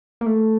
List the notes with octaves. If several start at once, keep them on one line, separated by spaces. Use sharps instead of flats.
A#3
A3